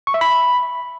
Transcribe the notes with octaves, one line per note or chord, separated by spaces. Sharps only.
C#6
E5
B5